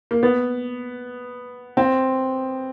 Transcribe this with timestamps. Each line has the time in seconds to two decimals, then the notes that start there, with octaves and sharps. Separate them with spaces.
0.11 A#3
0.23 B3
1.77 C4